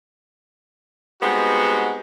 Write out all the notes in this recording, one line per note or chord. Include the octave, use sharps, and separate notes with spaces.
G3 G#3 B3 C4 D#4 F#4